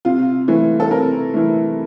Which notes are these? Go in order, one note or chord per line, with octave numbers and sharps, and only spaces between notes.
C3 F4
E3 A3
A4
C3 A#4
E3 A3